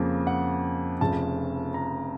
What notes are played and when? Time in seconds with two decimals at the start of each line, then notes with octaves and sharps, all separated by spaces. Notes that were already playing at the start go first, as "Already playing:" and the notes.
Already playing: F2 C#3 F3 A#3
0.27 F#5
1.01 F1 F2 C#3 A5
1.74 A#5